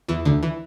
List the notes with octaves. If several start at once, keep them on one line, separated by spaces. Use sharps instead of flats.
E2 E3
D2 D3
E3